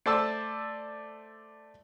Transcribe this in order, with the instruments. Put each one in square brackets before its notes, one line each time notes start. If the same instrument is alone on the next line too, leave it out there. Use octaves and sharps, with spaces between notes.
[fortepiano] A3 C5 D5 A5 E6